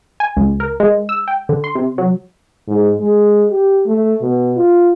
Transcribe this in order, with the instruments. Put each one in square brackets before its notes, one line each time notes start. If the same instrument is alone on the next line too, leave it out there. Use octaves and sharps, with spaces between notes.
[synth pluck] G#5
C#2
A#4
G#3
E6
G5
D3
C6
C3
F#3
[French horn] G#2
G#3
G4
A3
B2
F4